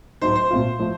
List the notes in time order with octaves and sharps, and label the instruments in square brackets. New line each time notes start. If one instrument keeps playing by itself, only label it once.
[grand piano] A2 F#3 A3 D#4 [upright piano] C5
[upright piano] C5
[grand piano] A#2 A3 C4 F4
F3 A3